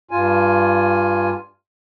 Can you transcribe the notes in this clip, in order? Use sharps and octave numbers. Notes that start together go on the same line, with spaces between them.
G2 F4 G#5